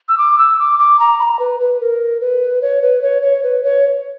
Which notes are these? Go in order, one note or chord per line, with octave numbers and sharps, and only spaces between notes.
E6
D6
E6
D6
D6
A#5
B5
A#5
B4
B4
A#4
B4
C#5
B4
C#5
C#5
B4
C#5